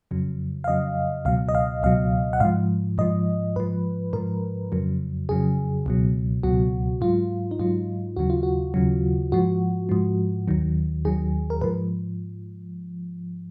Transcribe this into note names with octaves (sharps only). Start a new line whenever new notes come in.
F2 C#3 F#3
F5
F2 C#3 F#3 D#5
C#2 B2 F#3 F5
D#5
F5
C#2 B2 F#3 F5
F#5
G#2 F3 F5
G#2 F3 D#5
G#2 F3 B4
G#2 F3 A#4
F2 C#3 F#3
F2 C#3 F#3 G#4
C#2 B2 F#3
C#2 B2 F#3 F#4
G#2 F#3 F4
D#4
G#2 F#3 F4
D#2 C#3 F#3 F#4
F4
F#4
D#2 C#3 F#3
G#2 F3 F#4
G#2 F3
D#2 D#3 F#3
D#2 D#3 F#3 G#4
A#4
G#2 F3 B4